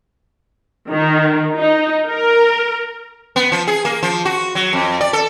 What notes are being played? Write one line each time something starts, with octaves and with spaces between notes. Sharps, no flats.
D#3
D#4
A#4
B3
F3
G#4
A#3
F3
F#4
F#3
F2
D5
A4